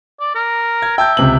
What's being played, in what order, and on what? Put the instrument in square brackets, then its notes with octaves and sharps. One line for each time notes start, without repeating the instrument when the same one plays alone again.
[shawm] D5
A#4
[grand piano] G#6
[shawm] E5 [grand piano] G5 A5 G6
[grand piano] C#2 C3 F#7